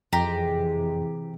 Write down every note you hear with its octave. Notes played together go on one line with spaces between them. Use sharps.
F2 C3 E3 G#3 G4 A#5